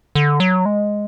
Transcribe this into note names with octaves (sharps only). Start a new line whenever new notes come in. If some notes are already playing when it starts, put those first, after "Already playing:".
D3
F#3
G#3